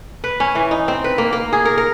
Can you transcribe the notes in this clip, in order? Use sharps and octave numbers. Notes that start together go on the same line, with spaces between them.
B4
C#4
E3
D#4
C4
B4
A#3
A#3
G#4
A#4
A#4